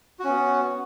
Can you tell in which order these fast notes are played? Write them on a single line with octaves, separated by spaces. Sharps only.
F#4 C#4 B3